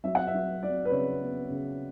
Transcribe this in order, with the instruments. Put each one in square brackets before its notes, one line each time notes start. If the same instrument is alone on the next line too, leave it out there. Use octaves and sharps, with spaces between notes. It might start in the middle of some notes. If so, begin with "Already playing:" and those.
[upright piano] F#3 E5
F#5
E5
F#3
F#3 D5
B4
C#3 C#5
B3
C#3